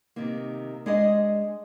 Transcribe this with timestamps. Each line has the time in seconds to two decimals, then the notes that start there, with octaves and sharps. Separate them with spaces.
0.16 C3 D#3 A#3
0.86 G#3 D4 G#4 D#5